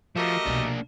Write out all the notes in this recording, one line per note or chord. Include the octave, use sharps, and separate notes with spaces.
F3 A3 F#4 G4 A#4 D#5
C2 B2 A#3 D4